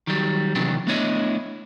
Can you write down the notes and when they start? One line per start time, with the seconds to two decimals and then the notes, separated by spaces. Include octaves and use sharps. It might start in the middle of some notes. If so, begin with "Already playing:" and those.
0.07 D#3 F#3 G3
0.55 C3 D#3 E3 F#3 B3 D4
0.87 A3 B3 D4 E4 C#5 D#5